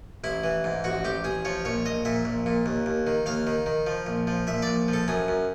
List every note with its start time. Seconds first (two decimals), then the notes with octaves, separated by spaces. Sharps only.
0.24 A1 E4
0.44 E3
0.64 G#2
0.84 A1 F#4
1.04 A1 G4
1.24 A1 G#4
1.45 F3 C#5
1.65 A#1 C#5
1.85 A#1 D#5
2.05 A#2 E5
2.25 A#1
2.46 A#2
2.66 D#2
2.86 D#2
3.07 D#3
3.26 D#2 F5
3.47 D#3
3.66 D#3
3.87 F3
4.07 A#1
4.27 F3
4.47 A#1 E5
4.62 A#1 D5
4.88 F3
4.93 A4
5.08 F#2 G#4
5.28 F#2